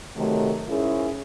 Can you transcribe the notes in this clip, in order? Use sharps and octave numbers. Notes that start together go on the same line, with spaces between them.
C3 D#3 F#3 A3
G#2 C#4 E4 G#4 A#4